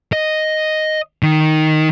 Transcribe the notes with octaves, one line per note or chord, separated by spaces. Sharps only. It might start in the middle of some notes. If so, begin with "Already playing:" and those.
D#5
D#3